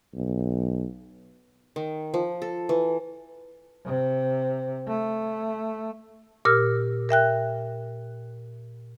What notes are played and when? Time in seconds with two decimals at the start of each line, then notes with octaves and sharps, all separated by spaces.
0.15 B1
1.76 D#3
2.14 F3
2.42 A4
2.69 E3
3.86 C3
4.87 A3
6.45 A#2 G4 A#4 E6 F6
7.09 A#4 E5 G5 F#6